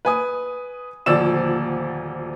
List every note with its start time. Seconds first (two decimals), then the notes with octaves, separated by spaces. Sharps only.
0.05 B4 G#5 D#6
1.06 D#1 D2 F3 D5 E6 E7